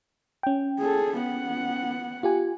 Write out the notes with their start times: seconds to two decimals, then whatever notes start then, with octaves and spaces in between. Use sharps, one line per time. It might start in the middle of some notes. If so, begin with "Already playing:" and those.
0.43 C#4 G5
0.79 G#4 A4
1.19 B3 F#5
2.23 F4 G4 G#5